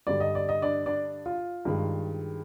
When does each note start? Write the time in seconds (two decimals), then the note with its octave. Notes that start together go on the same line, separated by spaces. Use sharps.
0.07 G2 D3 G3 D5
0.20 D#5
0.35 D5
0.49 D#5
0.62 D4 D5
0.86 D4 D5
1.26 F4
1.65 G2 D#3 G#3